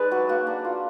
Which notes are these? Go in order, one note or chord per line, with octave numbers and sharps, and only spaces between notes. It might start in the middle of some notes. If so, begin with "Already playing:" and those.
Already playing: G#3 D#4 B4 D5
F#3 F#4
A#3 F#4
D4
F4